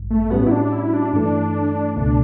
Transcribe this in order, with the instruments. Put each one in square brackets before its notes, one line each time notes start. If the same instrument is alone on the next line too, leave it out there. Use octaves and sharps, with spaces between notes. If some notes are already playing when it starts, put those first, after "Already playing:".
Already playing: [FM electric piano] A1 G2
[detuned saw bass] A3
[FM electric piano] A2 G3 C#4 F#4 [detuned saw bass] B3
[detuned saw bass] E4
D4
E4
D4
[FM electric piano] G2 E3 A3 [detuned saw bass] D4
[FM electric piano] C#2 B2 A3 [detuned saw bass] D4